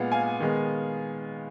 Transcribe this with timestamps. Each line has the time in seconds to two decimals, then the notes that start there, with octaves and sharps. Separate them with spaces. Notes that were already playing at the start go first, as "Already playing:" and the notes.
Already playing: A#2 G#3 B3 F5 F#5
0.12 F5 G#5
0.40 D#3 G#3 B3